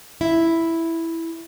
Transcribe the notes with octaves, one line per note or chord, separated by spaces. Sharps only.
E4